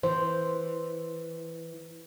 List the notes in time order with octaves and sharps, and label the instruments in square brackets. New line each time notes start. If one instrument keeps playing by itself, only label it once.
[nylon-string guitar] E3 [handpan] C5